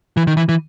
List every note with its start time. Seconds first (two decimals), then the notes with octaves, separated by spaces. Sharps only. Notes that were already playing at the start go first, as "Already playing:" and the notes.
0.17 E3
0.27 D#3
0.37 E3
0.49 E3